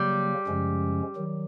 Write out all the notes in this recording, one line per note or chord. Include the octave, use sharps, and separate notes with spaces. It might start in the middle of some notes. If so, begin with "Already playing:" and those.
Already playing: C#3 F#3 G3 A#3
F#2 C#3 F3 G#3 C#4
D#3 F#3